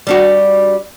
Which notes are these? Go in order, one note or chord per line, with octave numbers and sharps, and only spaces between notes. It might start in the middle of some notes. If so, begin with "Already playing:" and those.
G3 D4 F#4